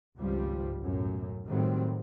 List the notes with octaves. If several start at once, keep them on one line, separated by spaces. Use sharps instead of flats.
G#1 C#2 G2 F3 G3
B1 F#2 A2
A2 D#3 F#3 G3 C4